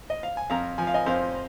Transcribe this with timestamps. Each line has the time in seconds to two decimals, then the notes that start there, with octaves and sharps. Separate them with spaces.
0.10 D#5
0.23 F5
0.37 G#5
0.50 F2 F5 A#5
0.78 F3 G#5
0.87 F5
0.94 D#5 G#5
1.06 F2 C5 F5